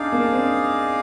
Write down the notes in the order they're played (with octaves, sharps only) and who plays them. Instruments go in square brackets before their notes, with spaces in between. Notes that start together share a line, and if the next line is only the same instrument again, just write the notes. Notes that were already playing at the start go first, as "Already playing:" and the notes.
Already playing: [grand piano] D4 [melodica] D#4 G#4 D5 F5
[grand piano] A#3
D4
C4